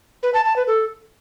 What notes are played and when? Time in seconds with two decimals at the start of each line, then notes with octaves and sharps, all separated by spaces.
0.23 B4
0.34 A5
0.45 A5
0.56 B4
0.67 A4